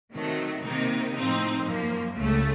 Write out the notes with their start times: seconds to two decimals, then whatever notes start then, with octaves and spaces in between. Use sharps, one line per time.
0.13 C3 D#3 F#3 A3
0.64 C3 D#3 A#3 D#4
1.15 A2 F3 C4 D#4
1.66 F#2 F3 A#3
2.16 C#2 C#3 A3